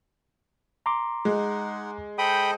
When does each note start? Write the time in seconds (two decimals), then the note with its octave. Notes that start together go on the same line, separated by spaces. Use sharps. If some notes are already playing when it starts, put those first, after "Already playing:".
0.86 A#5 C6 D6
1.25 G#3 D#4 F#5
2.18 A4 C5 D#5 G5 B5 D#6